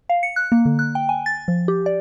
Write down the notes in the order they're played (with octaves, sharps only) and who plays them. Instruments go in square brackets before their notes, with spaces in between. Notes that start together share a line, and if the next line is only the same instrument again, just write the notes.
[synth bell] F5
C#7
F#6
A#3
D3
F#6
G5
G#5
A6
F3
G4
D5